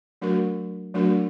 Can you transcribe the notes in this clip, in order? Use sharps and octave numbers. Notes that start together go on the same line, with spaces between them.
F#3 A3 D4 F#4 A#4
F#3 A3 D4 F#4 A#4